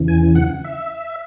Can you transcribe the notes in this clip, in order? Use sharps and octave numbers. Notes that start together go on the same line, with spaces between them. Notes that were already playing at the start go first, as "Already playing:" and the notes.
Already playing: E2 C#3 E3
G#5
F#5
E5